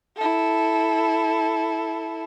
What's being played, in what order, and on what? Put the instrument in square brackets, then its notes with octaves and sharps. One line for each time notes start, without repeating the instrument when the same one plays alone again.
[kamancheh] E4 A4